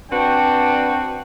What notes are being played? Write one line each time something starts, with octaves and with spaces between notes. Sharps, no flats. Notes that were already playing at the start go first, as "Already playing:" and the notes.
C4 D4 F#4 B4 G5